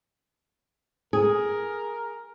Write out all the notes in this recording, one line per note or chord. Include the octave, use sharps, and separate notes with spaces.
G#4 A#4